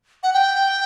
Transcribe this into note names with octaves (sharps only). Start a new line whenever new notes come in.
F#5
G5